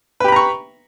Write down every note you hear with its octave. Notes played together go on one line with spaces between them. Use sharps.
G4 B4 A#5 B5 C#6